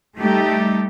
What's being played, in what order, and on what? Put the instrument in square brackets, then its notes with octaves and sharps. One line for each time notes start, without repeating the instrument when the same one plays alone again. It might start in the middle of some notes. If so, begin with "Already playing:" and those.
[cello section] G3 A3 D#4 G4